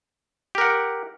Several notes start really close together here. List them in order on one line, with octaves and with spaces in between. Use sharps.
G4 A#4 F#5